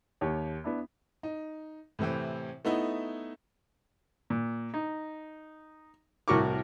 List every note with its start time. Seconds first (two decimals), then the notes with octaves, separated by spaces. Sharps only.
0.21 D#2 G4 C#5
0.64 B3 D4 E4
1.23 D#4
1.99 A2 C3 E3 C4
2.65 A3 B3 D#4 E4
4.30 A#2
4.74 D#4
6.28 C2 A2 F#4 A#4 C#6 D6